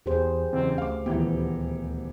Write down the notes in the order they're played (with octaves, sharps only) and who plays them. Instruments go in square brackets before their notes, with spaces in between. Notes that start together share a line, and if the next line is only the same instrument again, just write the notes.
[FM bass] E2 [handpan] G4 G#4 C5
[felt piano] F#1 E2 [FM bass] C4
[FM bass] D2 [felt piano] F5 D6
[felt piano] D#1 E3 G4 [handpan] B3